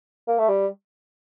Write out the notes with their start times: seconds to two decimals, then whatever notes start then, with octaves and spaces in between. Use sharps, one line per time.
0.28 A#3
0.38 A3
0.48 G3